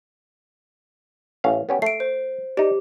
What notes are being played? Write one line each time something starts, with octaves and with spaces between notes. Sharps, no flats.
A1 C#4 F5
B3 C#4 G4
A3 C7 D7
C5
D#4 G4 D5